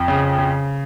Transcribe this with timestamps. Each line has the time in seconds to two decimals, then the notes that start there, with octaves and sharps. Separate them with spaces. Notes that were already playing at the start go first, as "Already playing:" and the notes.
Already playing: F2
0.08 C#3
0.38 C#3